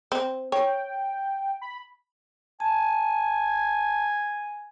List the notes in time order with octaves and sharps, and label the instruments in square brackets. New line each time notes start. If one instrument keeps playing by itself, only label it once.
[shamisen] C4
[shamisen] C#5 [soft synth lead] G5
[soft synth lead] B5
[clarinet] G#5 [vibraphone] A5